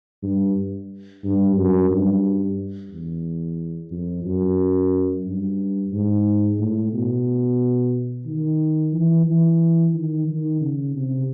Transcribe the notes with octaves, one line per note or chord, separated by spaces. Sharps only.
G2
G2
F#2
G2
E2
F2
F#2
G2
G#2
A2
B2
D#3
E3
E3
D#3
D#3
C#3
C3